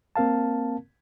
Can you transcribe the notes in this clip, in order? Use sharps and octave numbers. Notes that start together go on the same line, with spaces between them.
A#3 C4 A#4 F5 A5